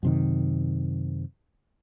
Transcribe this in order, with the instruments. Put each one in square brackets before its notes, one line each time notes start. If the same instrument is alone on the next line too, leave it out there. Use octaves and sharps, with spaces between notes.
[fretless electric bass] F#2 C3 D#3